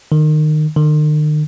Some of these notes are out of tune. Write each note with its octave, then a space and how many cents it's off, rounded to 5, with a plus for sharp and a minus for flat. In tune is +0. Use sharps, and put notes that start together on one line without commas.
D#3 -25
D#3 -45